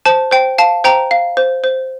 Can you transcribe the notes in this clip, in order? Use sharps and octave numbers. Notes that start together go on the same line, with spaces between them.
C5 A5
C5 G5
F5 A5
C5 G5 A#5
F5
C5
C5